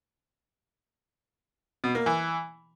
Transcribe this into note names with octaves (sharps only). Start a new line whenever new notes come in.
B2
A#3
E3